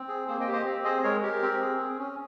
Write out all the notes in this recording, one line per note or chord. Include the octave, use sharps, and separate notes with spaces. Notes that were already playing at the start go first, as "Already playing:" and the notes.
Already playing: C4
G#4
A#3 G#4 C5
D#5 G5
G4
C5 D#5
C4
G#4 C5 D#5
G#3 A#4 C#5
G4 A#4
C4
G#4
G#4
C#4